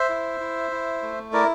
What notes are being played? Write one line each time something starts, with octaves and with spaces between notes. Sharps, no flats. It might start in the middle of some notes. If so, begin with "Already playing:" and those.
Already playing: C5 E5
E4
E4
E4
A3
E4 A#4 D5